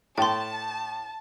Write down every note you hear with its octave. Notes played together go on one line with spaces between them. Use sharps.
A2 G5 A5 C6